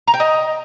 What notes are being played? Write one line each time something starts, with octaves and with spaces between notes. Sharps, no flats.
A#5
G5
D#5